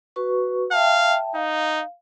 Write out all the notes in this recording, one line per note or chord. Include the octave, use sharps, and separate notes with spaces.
F#4 B4 C#6
E5 F5 G5 A5
D#4 F5